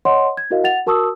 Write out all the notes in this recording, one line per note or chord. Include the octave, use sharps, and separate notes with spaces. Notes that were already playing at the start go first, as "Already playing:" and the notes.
C#5 D#5 F#5 C6
G#6
E4 F#4 A#4 D#5 F5
F#5 A6 F7
F#4 A#4 A5 C#6 D#6 E6